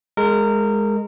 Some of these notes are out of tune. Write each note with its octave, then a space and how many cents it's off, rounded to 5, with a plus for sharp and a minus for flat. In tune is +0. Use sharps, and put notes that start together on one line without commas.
G#3 +0 A#4 -20